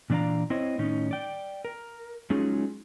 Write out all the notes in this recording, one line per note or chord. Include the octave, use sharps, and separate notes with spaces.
A#2 E3 D4 D5 F5 A#5
C4 E4 C5 C#5 D#5
A2 D#3 C#4 D#4
D5 G5
A#4
F#3 G#3 C#4 D#4 F4 G#4